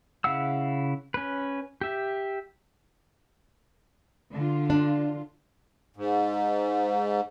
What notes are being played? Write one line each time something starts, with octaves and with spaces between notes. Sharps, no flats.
C#3 E4 F5 F#5 E6
C#4 B4
G4 E5
D3 F4
D4
G#2